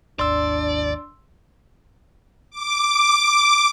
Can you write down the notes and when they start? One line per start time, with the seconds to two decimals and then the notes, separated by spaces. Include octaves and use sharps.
0.19 G#1 D#2 D4 D5 C6 E6
2.50 D6